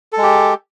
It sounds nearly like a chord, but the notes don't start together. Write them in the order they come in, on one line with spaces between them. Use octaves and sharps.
A4 G#3 G4